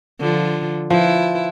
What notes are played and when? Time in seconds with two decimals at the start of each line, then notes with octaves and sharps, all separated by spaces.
0.20 D3 F3 F4
0.90 F3 E4 B4